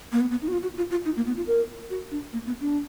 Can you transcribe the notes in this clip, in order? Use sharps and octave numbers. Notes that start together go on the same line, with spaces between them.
A#3
B3
B3
D#4
F#4
F4
F#4
F4
F4
D#4
A#3
B3
F4
A#4
F#4
D4
A#3
B3
D4